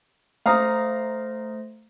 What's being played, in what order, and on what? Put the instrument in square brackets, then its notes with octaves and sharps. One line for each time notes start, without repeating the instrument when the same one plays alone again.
[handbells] A3 C5 A#6 [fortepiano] F5 A#5 D#6